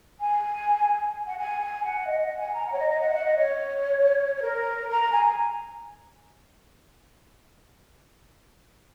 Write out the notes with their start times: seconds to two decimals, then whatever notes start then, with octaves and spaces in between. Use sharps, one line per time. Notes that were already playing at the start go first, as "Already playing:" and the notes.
0.20 G#5
1.27 F#5
1.38 G#5
1.61 G#5
1.84 F#5
2.07 D#5
2.23 F#5
2.38 G#5
2.54 A#5
2.66 F#5
2.72 C#5
2.77 D#5
2.90 D#5
3.01 F#5
3.09 D#5
3.13 F#5
3.24 D#5
3.37 C#5
4.36 C#5
4.42 A#4
4.89 A#5
5.12 G#5